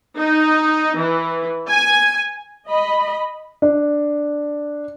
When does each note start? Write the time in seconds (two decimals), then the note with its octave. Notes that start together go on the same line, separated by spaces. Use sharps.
0.19 D#4
0.97 E3
1.68 G#5
2.66 D#5 B5
3.62 D4